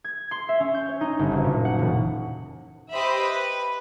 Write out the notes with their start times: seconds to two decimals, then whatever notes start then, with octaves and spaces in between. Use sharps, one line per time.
0.04 G#6
0.31 C6
0.49 E5
0.60 C#4
0.74 G6
0.89 C#5
1.01 D#4
1.19 G1
1.32 F#1
1.44 A#2
1.65 F#5
1.79 E1
2.90 G4 C5 D#5 E5 B5
3.23 B4